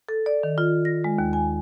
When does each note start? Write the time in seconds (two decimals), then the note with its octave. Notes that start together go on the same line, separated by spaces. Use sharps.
0.09 A4
0.26 D5
0.43 D#3
0.58 F4
0.85 A#6
1.04 G#3
1.19 D#2
1.33 G#5